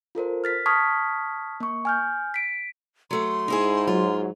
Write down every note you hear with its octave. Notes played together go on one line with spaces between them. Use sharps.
F4 A4 A#4 C5
F6 A6 B6
A5 C#6 D#6 F6 G#6 B6
A#3 C#6
G#5 F6 G6
B6 D7
F#3 A3 C6
G#2 D#4 E4 G#4
F#3 F4